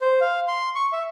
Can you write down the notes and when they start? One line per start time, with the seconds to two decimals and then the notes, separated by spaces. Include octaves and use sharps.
0.01 C5
0.21 F5
0.48 C6
0.75 C#6
0.93 E5